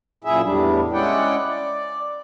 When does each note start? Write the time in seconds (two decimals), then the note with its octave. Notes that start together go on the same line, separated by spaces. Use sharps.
0.24 F#2 A#2 E4 G#4 E5
0.43 E2 A2 G3 D4
0.93 G#3 C#4 E4 D5 F#5 G5
1.46 D5